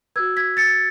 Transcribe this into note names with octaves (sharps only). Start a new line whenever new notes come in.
F#4 B4 E6 G#6
G#6 B6
A6 C#7